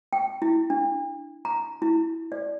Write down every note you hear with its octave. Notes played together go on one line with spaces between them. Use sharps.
G5
E4
D4
A#5
E4
D5